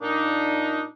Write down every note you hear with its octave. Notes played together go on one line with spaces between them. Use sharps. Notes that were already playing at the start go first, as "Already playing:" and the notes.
A#2 D4 D#4